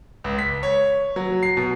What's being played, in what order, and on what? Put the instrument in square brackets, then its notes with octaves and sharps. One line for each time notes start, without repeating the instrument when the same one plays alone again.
[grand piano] C#2
B6
C#5
F#3
C7
B2